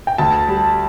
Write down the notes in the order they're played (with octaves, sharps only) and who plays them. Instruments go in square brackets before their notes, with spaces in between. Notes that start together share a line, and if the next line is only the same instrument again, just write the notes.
[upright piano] G5
[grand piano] D2 [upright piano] A5
[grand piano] G3